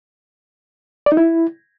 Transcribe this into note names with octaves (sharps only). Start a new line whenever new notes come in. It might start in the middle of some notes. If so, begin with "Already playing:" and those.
D5
D#4
E4